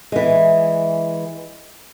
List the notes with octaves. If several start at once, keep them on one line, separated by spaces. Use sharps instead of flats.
E3 G#3